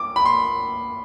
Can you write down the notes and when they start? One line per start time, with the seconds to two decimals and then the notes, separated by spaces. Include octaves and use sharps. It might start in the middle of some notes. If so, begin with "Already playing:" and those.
Already playing: D6
0.16 B5
0.25 C6